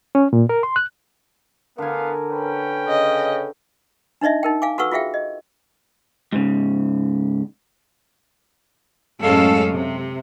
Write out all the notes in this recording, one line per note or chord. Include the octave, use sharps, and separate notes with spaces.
C#4
A#2
A#4
C6
F#6
D3 B3 A#4 F5 G#5
C#4 B4 G5
C#3 D#5
D4 D#4 C#5 D#5 E5
D#4 A#4 G5
F5 G#5 D6
F#4 A4 B4 F#5 C#6 E6
F4 F#4 G#4 E5 F5 G5
D#5
G#2 C#3
F#2 A2 G#3 C#4 A4 F5
C3